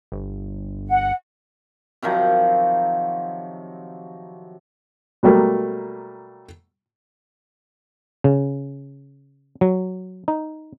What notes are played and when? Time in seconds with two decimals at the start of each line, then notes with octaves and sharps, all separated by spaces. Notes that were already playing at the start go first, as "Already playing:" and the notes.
0.12 G1
0.88 F#5
2.02 C3 D#3 F3 F#3
5.23 B2 F#3 G3 A3 A#3
8.24 C#3
9.61 F#3
10.28 D#4